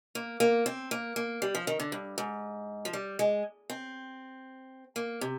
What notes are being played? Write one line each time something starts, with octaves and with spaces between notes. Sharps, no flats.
A#3
A#3
C4
A#3
A#3
G3
F3
D#3
D3
G2
G#2
F3
G3
G#3
C4
A#3
C3